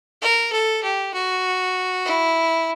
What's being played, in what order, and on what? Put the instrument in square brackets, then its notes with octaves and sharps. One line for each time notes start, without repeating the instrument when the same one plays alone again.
[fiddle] A#4
A4
G4
F#4
E4